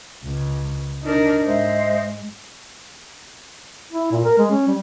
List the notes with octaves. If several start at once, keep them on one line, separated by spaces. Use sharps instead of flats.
C#2 C#3
D4 D#4 A#4
G#2 G#3 C5 D#5 E5
E4
A#2
A#4
G#3
C#4
G3